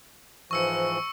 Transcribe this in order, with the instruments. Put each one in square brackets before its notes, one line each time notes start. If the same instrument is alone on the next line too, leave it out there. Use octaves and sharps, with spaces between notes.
[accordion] G#2 E3 F3 [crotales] C#6 E6 C#7